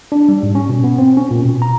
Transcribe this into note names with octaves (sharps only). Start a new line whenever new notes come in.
D4
G3
G#2
C#4
B2
B3
C4
C#4
A#2
B2
A#5